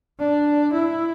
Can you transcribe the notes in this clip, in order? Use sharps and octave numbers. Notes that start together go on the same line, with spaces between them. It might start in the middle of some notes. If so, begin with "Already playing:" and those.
D4
E4